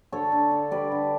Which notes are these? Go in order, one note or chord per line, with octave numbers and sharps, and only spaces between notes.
D3 A4 C#5
D3
D3
G3 B4 D5
D3